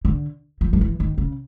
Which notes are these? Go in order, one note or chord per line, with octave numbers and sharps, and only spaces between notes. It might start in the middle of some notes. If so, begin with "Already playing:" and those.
D3
F3
F3
E3
D#3
C#3